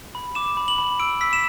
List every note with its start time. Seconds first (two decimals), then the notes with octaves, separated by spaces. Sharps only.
0.15 B5
0.35 D6 E7
0.57 B5
0.68 F#7
0.78 B5
1.00 E6 D7
1.21 E6 B6
1.33 E7